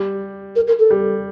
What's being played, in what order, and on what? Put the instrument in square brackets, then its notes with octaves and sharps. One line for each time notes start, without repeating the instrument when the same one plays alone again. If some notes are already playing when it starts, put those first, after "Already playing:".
Already playing: [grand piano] G3
[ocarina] A#4
A#4
A4
[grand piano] G3